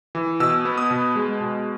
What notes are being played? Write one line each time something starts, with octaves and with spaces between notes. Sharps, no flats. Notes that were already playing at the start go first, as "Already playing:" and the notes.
E3
B2 E6
B3
D#6
B2
G#3
B2